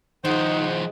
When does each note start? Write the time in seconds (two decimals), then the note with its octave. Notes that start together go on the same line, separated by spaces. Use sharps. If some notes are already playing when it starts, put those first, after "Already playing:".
0.25 D#3 F3 G#3 D#4 C5 F#5